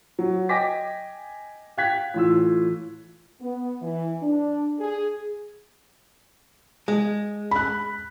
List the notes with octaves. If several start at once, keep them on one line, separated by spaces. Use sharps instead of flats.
F#3
D#5 G5 G#5 D6 A#6 B6
F5 G5 F#6 G#6 B6
A2 E3 F4 E6
B3
E3
D4
G#4
G#3
B5 F#6